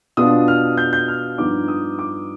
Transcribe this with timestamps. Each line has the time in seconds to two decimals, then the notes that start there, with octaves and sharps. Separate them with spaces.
0.17 B2 B3 D4 F4 D#6
0.48 F6
0.78 G6
0.93 G6
1.08 F6
1.38 G2 F3 B3 D#4 D6
1.68 D#6
1.99 D6